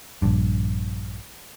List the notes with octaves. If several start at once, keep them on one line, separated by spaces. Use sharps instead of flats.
A#1 G2